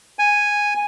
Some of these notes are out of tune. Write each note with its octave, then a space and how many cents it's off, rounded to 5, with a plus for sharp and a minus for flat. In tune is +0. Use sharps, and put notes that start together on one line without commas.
G#5 -5